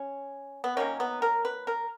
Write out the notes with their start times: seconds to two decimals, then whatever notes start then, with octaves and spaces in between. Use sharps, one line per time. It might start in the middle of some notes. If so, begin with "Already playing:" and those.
Already playing: C#4
0.64 B3
0.77 D#3 F#3 A#3 C#4
1.00 B3
1.22 A#4
1.45 B4
1.67 A#4